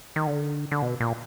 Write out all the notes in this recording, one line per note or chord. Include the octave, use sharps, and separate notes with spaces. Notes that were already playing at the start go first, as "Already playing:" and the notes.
D#3
D3
D3
B2
A#2